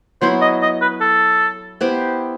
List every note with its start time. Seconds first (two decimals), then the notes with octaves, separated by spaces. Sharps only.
0.21 F#3 B3 E4 C5
0.41 D#5
0.62 D#5
0.81 B4
1.01 A4
1.81 B3 E4 G4 C5